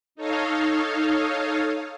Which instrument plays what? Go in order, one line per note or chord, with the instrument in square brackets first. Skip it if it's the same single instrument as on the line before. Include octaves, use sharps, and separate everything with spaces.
[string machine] D#4 A4 C#5 D#5 F5